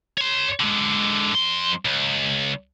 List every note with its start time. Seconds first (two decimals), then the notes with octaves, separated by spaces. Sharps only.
0.18 C#5 C6
0.60 D3 G#3
1.34 F2 C6
1.85 C#2